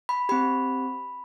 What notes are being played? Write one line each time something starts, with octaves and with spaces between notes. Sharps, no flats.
B5
C4 G4 B5